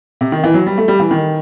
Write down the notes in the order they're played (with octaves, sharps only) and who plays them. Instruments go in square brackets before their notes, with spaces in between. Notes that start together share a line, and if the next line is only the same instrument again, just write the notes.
[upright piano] C3
D#3
E3
F#3
G3
A3
G3
E3
D#3